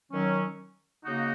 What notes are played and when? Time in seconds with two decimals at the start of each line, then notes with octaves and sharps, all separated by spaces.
0.12 D#3 F#3 C#4
1.04 C#3 A#3 D#4 F#4